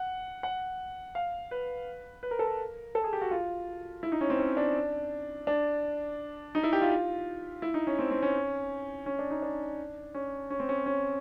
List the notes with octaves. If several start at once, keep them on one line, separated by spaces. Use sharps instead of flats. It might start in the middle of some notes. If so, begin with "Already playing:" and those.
Already playing: F#5
F#5
F5
B4
B4
A#4
A4
A#4
A4
G#4
G4
F#4
F4
E4
D#4
C#4
C4
C#4
D4
D4
D#4
E4
G4
F4
E4
D#4
C#4
C4
C4
C#4
C#4
D4
D#4
D4
C#4
C#4
C4
C#4
C#4